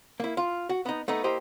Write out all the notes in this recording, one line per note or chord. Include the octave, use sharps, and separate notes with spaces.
A#3 E4
F4
F#4
B3 D#4
A3 B3 D#4
A#3 E4 G4 C5 D#5